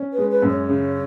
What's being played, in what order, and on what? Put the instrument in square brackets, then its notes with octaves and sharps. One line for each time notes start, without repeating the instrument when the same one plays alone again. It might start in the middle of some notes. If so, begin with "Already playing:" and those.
Already playing: [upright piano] C#4
[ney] B4
[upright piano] G#3
[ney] B4
[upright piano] F#2
[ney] C#5
[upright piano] C#3